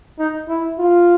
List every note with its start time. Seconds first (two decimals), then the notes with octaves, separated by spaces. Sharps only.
0.19 D#4
0.49 E4
0.79 F4